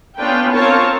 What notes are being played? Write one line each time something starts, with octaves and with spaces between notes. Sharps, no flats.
B3 C#4 D4 F4 B4 G5
C4 F4 A#4 C#5 A5